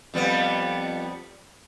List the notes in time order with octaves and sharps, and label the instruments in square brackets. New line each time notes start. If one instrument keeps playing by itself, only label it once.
[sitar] F2 G3 B3